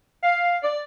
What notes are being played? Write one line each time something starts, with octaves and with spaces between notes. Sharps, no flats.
F5
D5